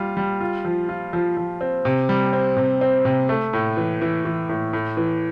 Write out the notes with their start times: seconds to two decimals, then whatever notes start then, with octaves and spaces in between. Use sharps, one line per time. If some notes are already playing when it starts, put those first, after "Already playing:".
Already playing: G3 F4
0.17 G3
0.41 F4
0.65 F3
0.89 F4
1.13 F3
1.37 F3
1.61 C4
1.85 C3
2.09 G3
2.33 C4
2.57 C3
2.81 C4
3.05 C3
3.29 A3
3.53 A2
3.77 E3
4.01 E3
4.25 E3
4.49 A2
4.73 A2
4.97 E3